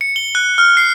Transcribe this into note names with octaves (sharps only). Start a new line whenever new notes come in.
C#7
G7
F#6
F6
C7